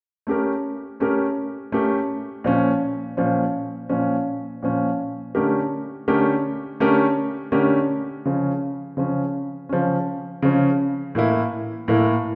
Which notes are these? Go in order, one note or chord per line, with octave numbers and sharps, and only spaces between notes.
A3 C#4 G4 A#4
A3 C#4 G4 A#4
A3 C#4 G4 A#4
A#2 F3 C#4
A#2 F3 C#4
A#2 F3 C#4
A#2 F3 C#4
D3 A3 C#4 G4 A#4
D3 A3 C#4 G4 A#4
D3 A3 C#4 G4 A#4
D3 A3 C#4 G4 A#4
C#3 F3 C#4
C#3 F3 C#4
C#3 F3 C#4
C#3 F3 C#4
A2 E3 A#3 E4
A2 E3 A#3 E4